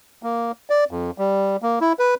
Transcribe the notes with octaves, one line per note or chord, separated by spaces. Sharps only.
A#3
D5
F2
G3
A#3
E4
B4